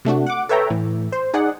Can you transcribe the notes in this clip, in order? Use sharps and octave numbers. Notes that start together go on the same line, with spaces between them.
C3 A3 D4 F#4
F#5 D6
A4 B4 C#5 E5 G5 A#5
A2 E3
C5
D#4 G#4 D5 F#5